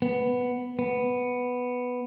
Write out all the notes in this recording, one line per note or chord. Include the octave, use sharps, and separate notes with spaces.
B3
B3